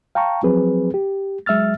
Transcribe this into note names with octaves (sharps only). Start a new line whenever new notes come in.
F5 G5 A5 A#5 C#6
F3 F#3 C4 G#4 B4
G4
F#3 G#3 E5 E6 F6 A6